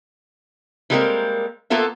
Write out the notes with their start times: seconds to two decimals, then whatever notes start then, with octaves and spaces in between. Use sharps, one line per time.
0.90 E3 G3 G#3 A#3 C4 A#4
1.70 A#3 B3 F4 A4 E5